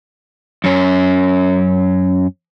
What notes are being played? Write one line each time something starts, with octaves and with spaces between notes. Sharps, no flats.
F#2 C#4